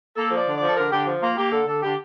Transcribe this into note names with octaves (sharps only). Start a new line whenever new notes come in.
A#3 A4
F3 D5
D3
F3 D5
A4
D3 A#4
D3 G4
F3
A#3 F4
A#3 G4
D3 A4
D3 A4
D3 G4